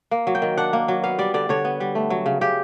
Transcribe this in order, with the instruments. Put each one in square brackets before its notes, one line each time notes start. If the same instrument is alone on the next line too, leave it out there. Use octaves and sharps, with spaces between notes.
[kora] A#3
F#3
G5
D#3
D4 F#5
A#3
F#3
B3 F5
G3 D5
D3 D5
D3 C#5
B3
G3
A3
F#3
C#3
C#3 G4